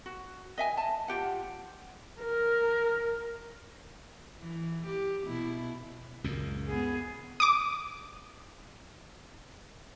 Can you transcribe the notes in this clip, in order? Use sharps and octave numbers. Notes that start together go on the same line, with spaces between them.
F#4
D#5 E5 G#5
A5
F4 G4 F#5
A#4
E3
G4
B2 E4
C#2 F#2 A#2
B3 G#4
D6 D#6